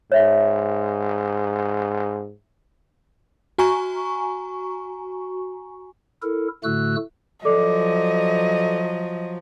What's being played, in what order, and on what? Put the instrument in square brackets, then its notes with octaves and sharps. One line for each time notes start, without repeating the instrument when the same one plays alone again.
[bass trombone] G#2 [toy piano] C#5 E5
[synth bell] F#4 G#5 A#5 C#6
[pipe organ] E4 A4 A#4
A2 D3 A3 F#4 E6 F#6
[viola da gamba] F3 F#3 [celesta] A4 D5 D6 [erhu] D#5